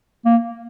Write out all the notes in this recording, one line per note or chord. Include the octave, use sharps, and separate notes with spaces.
A#3